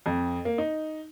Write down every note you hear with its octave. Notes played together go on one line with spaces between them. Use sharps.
F2
A#3
D#4